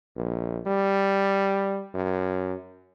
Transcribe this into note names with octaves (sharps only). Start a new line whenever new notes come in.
A#1
G3
F#2